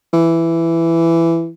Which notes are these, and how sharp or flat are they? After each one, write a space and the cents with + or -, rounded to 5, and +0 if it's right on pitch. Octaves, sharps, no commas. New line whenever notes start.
E3 +10